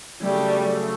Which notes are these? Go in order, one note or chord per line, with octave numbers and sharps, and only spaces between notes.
C#3 F#3 G3 A3